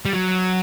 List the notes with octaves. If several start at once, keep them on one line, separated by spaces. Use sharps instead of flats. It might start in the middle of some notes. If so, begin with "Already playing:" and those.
G3
F#3